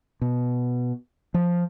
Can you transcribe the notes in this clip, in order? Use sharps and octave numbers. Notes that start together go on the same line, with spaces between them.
B2
F3